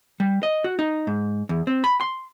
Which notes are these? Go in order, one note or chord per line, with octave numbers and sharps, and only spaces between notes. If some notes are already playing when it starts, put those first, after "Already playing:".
G3
D#5
F#4
D#4
G#2
E2
C4
B5
C6